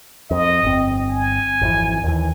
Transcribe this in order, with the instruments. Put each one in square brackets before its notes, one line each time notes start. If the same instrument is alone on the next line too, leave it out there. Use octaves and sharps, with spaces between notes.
[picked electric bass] F2 [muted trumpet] D#5
[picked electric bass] G1 C4
[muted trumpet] G#5
[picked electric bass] G#1 F2 E3
D#2 E3